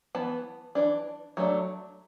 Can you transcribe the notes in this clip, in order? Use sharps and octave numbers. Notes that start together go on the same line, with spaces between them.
E3 B3 A5
E3 D4
F#3 A3 D4